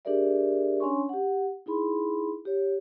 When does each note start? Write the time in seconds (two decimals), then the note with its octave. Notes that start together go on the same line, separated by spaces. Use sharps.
0.05 D4 G4 G#4 A#4 D5 E5
0.80 C#4 D4 C#5 G#5 C6 C#6
1.09 G4 F#5
1.66 D#4 E4 G#4 B5 C6
2.45 G4 C#5